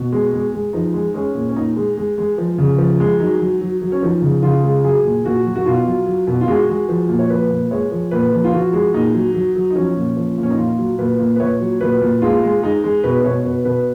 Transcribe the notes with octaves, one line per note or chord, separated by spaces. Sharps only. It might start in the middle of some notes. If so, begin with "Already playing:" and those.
Already playing: B2
G#3
G#3
G#3
F3 D#4
G#3
G#3 C#4
A#2
C#4
A#2 D#4
G#3
G#3
G#3
F3
C#3
F3
G#3
F#3 D#4
F#3
F#3
F#3
C#4
F3 D#4
C#3
C#3 F4
G#3
F#3 G#4
A#2
A#2 F#4
F#3
F#4
B2 F4
F#3
F#3
B2
F4
G#3 F#4
G#3
F3
A#2
C#5
F3 B4
A#2
G#3 C#5
F3
A#2 B4
F3
F4
F3 F#4
G#3
A#2 D#4
F#3
F#3
F#3
D#4
F3 C#4
A#2
F3
A#2
C#4
D#4
A#2 F4
F#3
A#2 B4
A#2
B4
A#2 C#5
F#3
A#2 B4
A#2
G#3 F4
G#3
G#3 D#4
G#3
B2 B4
B2 C#5
B2 B4
B2 B4